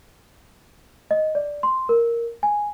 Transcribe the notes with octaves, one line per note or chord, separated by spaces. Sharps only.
D#5
D5
C6
A#4
G#5